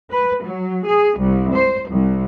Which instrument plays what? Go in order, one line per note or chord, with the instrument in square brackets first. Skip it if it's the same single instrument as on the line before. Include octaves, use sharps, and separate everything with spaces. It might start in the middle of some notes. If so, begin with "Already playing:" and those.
[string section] B4
F#3
G#4
C2
C5
C2